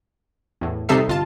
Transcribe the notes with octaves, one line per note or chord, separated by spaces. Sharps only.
E2 A2
C3 G3 D#4 A4 E5 C7
G1 F4 A5